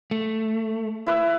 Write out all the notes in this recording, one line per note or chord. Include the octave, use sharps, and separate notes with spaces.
A3
E4 B4 E6